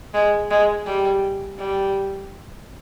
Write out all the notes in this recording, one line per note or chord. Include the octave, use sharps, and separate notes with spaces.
G#3
G#3
G3
G3